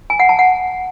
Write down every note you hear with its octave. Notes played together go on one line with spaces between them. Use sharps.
G#5
F#5
A5
F#5